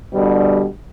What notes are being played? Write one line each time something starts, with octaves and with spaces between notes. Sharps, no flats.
B2 D3 G3